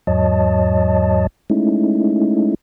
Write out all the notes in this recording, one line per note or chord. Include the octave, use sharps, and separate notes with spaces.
E2 G#2 F#3 C#5 D#5 A5
G#3 A3 C#4 D#4 E4